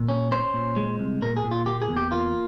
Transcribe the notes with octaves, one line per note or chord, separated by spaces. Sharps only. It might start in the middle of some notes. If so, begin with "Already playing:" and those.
Already playing: A#2
C#4
C#4 C5
A#2
G#3
C2
A#2 A#4
G#4
A#2
F4
A#3 G4
G#4
E2
G4
A#3 F4